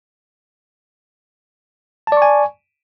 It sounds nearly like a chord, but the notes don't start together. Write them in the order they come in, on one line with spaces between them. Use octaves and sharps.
A5 D5 C#6 G#5